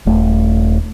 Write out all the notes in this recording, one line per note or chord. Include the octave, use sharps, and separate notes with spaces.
D#1 A3